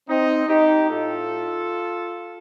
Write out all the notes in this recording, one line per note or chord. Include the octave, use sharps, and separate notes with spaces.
C4 D#4
D#4 G4
A2 A3 F4 A4